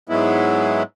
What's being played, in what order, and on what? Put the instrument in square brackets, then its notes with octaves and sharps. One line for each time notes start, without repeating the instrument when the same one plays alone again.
[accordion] G#2 F#3 G#3 B3 E4